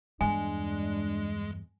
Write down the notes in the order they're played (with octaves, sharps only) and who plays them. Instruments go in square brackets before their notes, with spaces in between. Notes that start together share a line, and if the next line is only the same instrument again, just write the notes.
[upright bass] E2 G2 [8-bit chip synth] G#3 [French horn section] D4 [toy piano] G#5